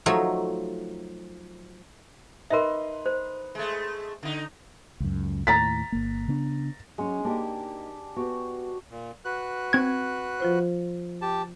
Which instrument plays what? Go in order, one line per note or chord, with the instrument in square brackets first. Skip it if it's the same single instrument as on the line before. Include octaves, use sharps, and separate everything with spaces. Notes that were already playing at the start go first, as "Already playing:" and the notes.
[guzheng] F3 F#3 A3 D#4 C#5
[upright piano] D#4 B4 C6 [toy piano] A#4 E5
[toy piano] C5
[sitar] G#3 A3
D3 D#4
[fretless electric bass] C#2 F#2
[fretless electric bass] D#2 A2 [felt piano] A#5 A6 B6
[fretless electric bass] G1 A#3
C#3 B3 D4
[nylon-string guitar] F#3 C#4 [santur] G#3
[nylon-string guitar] A#3 D#4 D#5 [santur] D4 G4
[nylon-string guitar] B3 G4 [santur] F#4
[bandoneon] A#2
F#4 B4 F#6
[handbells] C4 G#6
[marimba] F3 F4 C5
[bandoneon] G4 A5